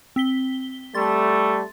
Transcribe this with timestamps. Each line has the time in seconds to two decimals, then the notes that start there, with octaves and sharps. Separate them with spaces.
0.16 C4 B6 G7
0.95 G3 A3 C6 A6